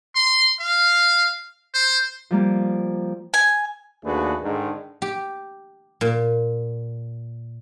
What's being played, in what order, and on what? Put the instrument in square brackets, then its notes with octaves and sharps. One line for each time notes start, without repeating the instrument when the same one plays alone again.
[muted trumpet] C6
F5
C5
[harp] F3 G3 A#3
[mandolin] G#5
[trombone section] D#2 A3 D4 F#4 G#4 B4
G#2 D3 D#3
[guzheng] G4
A#2